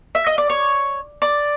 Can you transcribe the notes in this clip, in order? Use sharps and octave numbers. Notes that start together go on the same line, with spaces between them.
E5
D#5
D5
C#5
D5